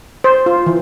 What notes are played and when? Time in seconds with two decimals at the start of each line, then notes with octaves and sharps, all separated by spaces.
0.24 C5
0.46 F4
0.66 E3